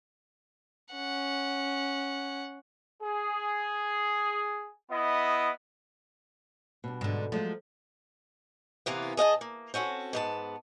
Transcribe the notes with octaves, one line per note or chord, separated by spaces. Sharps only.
C#4 F#5
G#4
B3 E4 D#5
B2 G3 D4
G#2 D3
F3 F#3 G#3 A3
C3 E3 A#3 B3
G#4 D#5 F5 A5
A#3
C4 C#4 F#4 A4
G#2 B3 A5